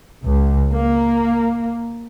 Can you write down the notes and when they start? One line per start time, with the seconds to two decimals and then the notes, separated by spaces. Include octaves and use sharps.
0.24 C#2
0.73 A#3